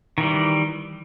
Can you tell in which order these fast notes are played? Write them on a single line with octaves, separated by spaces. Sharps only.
D#3 E3 G3